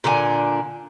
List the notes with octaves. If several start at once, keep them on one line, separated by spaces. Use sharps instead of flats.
A#2 D3 D4 G#5